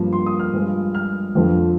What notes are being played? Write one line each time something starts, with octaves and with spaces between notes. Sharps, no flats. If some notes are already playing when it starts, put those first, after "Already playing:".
Already playing: G2 F3 A#3
C6
D#6
F6
G2 F3 G#3
F6
F2 D3 F3